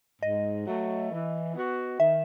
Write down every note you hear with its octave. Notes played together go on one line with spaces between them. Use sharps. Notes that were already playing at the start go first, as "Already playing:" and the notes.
G#2 D#5
F#3 A3
E3
B3 F#4
D#3 E5